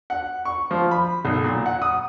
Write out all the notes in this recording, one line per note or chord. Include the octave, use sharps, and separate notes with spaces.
F#5
C#6
F3
B5
B1
A#2
F#5
D#6